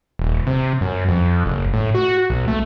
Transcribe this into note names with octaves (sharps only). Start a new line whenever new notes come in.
D#1
C3
F#2
F2
F#1
A2
F#4
B1
A3